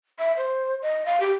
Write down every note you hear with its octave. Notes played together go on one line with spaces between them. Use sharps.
E5
C5
D#5
F5
G4